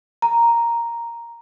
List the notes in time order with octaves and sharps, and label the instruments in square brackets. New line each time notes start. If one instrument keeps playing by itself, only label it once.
[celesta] A#5